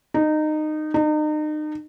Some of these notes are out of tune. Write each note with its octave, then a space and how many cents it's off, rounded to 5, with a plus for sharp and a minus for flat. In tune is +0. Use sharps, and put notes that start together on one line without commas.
D#4 -20
D#4 -35